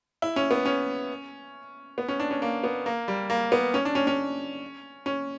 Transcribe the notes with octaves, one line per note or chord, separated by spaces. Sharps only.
E4
C#4
B3
C#4
B3
C#4
D4
C#4
A#3
B3
A#3
G3
A#3
B3
C#4
D4
C#4
C#4
C#4